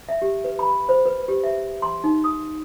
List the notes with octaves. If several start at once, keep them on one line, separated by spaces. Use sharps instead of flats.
E5
G4
B4
B5
C5
B4
G4
E5
C6
D#4
D#6